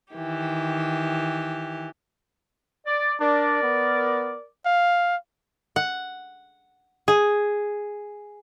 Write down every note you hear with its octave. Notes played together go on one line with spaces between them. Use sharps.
D#3 E3 G4
D5
D4 A#4 D5
B3
F5
F#5
G#4